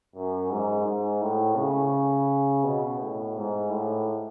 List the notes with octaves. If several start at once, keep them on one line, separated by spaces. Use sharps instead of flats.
F#2
G#2
G#2
A2
C#3
B2
A2
G#2
A2